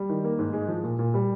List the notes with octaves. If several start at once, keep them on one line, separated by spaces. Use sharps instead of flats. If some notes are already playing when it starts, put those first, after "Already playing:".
Already playing: G3
D#3
A#3
G#2
G#3
F3
A#2
A#2
G3